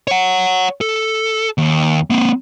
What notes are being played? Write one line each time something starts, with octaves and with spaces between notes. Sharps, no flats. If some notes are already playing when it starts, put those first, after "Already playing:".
C#5 F#5
A4
D#2
A#3 C4